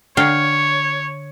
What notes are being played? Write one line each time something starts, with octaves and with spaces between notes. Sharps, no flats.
D3 C#5 F5 G5